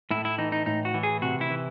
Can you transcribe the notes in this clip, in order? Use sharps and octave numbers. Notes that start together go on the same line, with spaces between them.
A2 E4
E4
E3 D#4
D#4
A2 D#4
F#4
E3
G#4
C3 F#4
E4
E3